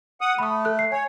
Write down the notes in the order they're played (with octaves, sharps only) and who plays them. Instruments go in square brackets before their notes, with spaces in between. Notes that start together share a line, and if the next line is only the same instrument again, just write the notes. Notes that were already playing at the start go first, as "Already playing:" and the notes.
[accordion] F#5 D#6
[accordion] A3 [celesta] B5 D#6
[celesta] A4 F#6
C7
[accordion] C#5 [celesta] G#5